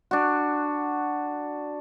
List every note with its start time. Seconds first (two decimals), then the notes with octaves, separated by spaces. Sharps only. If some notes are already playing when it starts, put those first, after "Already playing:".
0.11 D4 F#4